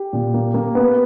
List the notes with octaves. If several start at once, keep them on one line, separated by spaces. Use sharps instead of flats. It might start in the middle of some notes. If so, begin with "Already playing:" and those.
Already playing: G4
A#2
A#3
A#3
B3